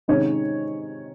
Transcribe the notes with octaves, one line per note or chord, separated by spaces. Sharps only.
C3 D#3 G#3 C#4 C#5